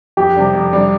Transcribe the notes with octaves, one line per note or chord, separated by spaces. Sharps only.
F2 G4
C3 G3 D4
F2
C3 G3 D4